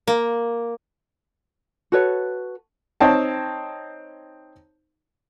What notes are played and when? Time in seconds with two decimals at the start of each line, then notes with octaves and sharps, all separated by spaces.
0.07 A#3
1.92 F#4 A4 B4 C#5
3.00 C4 D#4 C#5 A5